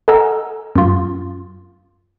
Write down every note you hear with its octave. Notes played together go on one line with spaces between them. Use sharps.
A4 D#5 F#5 G#5 A#5 E6
F#2 F4